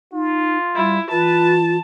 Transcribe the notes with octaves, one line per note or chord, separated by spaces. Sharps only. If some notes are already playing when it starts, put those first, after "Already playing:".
D#4 F4
G3 E4
E3 F4 B4 A5